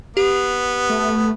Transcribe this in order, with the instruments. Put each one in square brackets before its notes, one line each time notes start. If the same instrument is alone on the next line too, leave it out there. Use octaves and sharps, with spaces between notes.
[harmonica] B3 [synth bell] G4
[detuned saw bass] A3